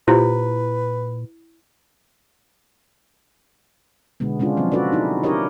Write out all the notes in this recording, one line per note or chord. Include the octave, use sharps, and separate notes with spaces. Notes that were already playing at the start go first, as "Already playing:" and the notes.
A#2 E4 F4 G4 B4 C5
B2 D3 G#3 B3
C#3 G#3 C#4 D4 F4
F3 F#3 C4
F4 F#4 A4 B4 D5
D#4 E4
D4 E4 G4 A#4 C#5 D#5